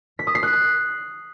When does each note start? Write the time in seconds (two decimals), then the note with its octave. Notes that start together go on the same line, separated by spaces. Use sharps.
0.19 B6
0.27 D#6
0.35 C7
0.43 F#6